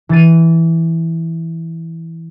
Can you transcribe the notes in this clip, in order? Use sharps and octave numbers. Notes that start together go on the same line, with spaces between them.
E3 A6 D#7